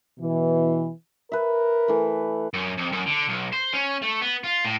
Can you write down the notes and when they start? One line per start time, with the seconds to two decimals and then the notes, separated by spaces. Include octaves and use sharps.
0.19 B2 E3
1.32 A#4 B4 E5
1.88 E3 A3
2.53 F#2
2.78 F2
2.93 F#2
3.07 D3
3.29 B1
3.53 C5
3.74 C#4
4.02 A3
4.21 B3
4.44 F4
4.65 A2